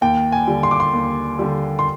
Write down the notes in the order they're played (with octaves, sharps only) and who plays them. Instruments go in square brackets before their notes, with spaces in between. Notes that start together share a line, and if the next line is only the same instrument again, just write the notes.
[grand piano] D#2 G5
G#5
D3 G3
C6
D6
C6
D#2
D3 G3
C6